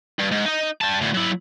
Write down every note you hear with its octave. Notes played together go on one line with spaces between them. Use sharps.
G2
G#2
D#4 D#5
G3 A5
D2 A2
F#3 E4